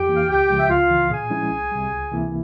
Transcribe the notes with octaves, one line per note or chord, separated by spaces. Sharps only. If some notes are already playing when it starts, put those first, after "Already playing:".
Already playing: F2 G4 G5
E3 A#3
F5
C#2 G4 G5
C#3 F3 G#3
E5
C#2 F4 F5
C#3 E3
A#2 G#4 G#5
F3 G#3 C#4 E4
C2
C3 G3
C#2
C3 E3 A#3 E4